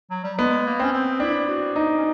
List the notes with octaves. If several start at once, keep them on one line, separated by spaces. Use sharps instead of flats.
F#3
G3
G#3 B3
A#3
C4 C#4
C4
D4 E4
F#4
D#4
C#4